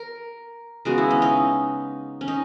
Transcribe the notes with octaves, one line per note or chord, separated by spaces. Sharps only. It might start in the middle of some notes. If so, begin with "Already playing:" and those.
Already playing: A#4
C#3 G#3 B3 F#4
E4
C#4
D#4
C#4
D#4